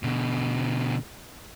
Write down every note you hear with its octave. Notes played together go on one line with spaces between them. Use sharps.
B2 D3